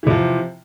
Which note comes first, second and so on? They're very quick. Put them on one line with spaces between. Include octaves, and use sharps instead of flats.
E3 C3 F3